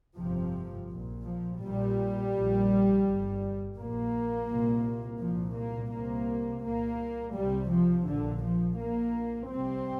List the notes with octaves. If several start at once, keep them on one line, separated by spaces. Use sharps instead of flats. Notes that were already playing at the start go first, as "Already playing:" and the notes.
G1 F2 C3 F3
A#1 A#2
F3
A#1 A#2 G3
A#1 A#2
G1 G2
A#1 A#2 A#3
C2 A#2
C2 A#2 F3
A#3
C2 C3 A#3
C2 A#2 A#3
C2 G3
C3
F3
A#1 A#2 D3
F3
A#1 A#2 A#3
C2 C3 C4